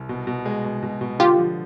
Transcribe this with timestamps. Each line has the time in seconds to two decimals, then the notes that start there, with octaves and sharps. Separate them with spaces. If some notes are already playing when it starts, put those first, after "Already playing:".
Already playing: C2
0.09 B2
0.27 B2
0.45 G#3
0.64 B2
0.83 B2
1.01 B2
1.20 D3 F4 G4
1.38 F3